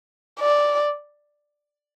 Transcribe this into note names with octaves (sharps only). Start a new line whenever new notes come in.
D5